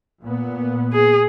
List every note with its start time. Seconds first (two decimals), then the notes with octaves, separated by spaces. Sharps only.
0.21 A#2 B3
0.93 G#4